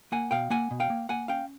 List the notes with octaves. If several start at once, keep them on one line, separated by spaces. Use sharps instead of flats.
A#3 F#5 G#5
B2 F5 G5
A#3 F#5 G#5
B2
F5 G5
A#3
A#3 F#5 G#5
C#4 F5 G5